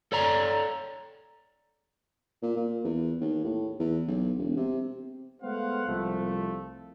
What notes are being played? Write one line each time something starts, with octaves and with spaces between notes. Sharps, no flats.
A4 C#5 D5 A#5
A#2
A#2
E2
D#2
A2
E2
B1
E1
C3
G#3 A3 B3 C5 F5 F#5
C2 F3 A3